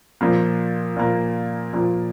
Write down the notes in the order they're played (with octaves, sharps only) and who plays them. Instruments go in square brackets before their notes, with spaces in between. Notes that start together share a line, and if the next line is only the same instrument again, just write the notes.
[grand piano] A#2 F3 A#3
A#2 F3 A#3
A#2 F3 A#3